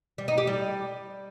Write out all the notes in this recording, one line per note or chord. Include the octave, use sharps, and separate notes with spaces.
G3
D#4
G4
G3